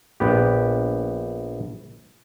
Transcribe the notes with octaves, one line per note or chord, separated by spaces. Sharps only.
A#1 B3 G4